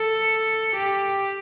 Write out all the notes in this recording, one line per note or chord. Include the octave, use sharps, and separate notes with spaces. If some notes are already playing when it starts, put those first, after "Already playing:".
Already playing: A4
G4